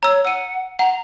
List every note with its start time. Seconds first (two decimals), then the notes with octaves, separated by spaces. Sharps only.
0.03 C#5 A#5 E6
0.25 F#5 E6 D#7
0.79 F#5 A#5